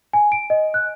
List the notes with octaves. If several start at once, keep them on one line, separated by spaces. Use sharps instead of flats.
G#5
D7
D#5
F#6